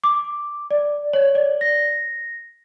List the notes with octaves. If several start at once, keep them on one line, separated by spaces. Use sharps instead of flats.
D6
D5
C#5
D5
A#6